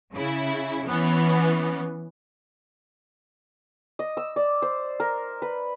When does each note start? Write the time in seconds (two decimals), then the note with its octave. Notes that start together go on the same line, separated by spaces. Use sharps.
0.13 C#3 E4
0.87 E3 B3 C#4
3.99 D#5
4.17 E6
4.36 D5
4.62 C5
5.00 A#4
5.42 B4